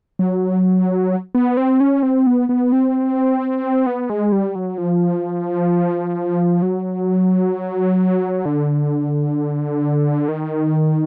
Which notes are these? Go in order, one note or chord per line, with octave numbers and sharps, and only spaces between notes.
F#3
B3
C4
C#4
C4
B3
B3
C4
B3
G#3
G3
F#3
F3
F#3
D3
D#3